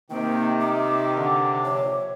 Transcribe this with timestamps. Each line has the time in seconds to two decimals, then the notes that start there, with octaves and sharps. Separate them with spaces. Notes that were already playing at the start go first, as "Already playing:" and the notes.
0.10 C3 D#3 A#3 G5
0.61 E5 D6
1.17 D3
1.65 A#1 C#5